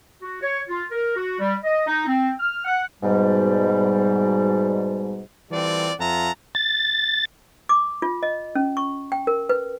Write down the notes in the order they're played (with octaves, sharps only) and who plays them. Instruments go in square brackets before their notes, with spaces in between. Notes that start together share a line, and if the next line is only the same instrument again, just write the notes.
[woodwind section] F#4
C#5
F4
A#4
F#4
G3
D#5
D#4
C4
F6
F#5
G#2 B2 G3
[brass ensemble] E3 G3 C4 F4 A4 D5
F2 F4 E5 F#5 A5 A#5
[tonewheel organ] A6
[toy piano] D6
F4
D#5
C#4
C#6
G5
A#4
B4